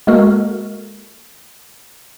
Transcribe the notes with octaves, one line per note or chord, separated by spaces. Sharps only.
G#3 A#3 F#4 A4 A#4